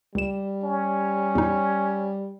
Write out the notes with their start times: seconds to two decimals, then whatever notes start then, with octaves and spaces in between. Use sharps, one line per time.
0.15 C#2 G3 E7
0.63 C#4
1.35 E2 A#2 D#4